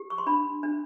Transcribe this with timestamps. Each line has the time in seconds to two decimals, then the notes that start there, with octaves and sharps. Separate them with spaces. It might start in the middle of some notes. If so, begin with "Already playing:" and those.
Already playing: G4
0.10 C#6
0.18 C6
0.27 D4 B5
0.63 D4